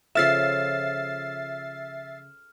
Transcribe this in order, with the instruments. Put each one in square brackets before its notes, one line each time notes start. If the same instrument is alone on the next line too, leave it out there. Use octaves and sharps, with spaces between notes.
[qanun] C#3 F3 A4 [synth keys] E5 A6 C7 [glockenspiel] F6 E7